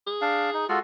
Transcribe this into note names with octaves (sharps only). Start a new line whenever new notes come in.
G#4
D4 F5
D#4
G#3 F4 F#4 A4